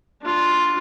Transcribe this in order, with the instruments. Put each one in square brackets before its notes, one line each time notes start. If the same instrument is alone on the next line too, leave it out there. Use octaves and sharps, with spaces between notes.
[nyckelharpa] D4 F4